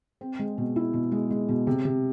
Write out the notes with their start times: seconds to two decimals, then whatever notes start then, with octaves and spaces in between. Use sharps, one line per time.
0.21 C4
0.39 G#3
0.58 B2
0.76 E4
0.93 B2
1.12 G#3
1.30 G#3
1.49 B2
1.67 C3
1.85 C3